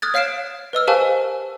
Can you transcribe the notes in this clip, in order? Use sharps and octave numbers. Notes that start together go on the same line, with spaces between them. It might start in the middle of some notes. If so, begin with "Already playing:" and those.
D#6 F6 F#6 G#6 A6
C#5 F5 F6 C7 D7 E7
B4 D#5 E6 F6
G4 A#4 C5 F5 G#5 A5